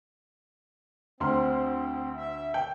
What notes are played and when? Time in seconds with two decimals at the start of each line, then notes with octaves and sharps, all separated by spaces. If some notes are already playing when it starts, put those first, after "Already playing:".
1.20 D2 C4 C6 F6
2.16 E5
2.54 G5 G6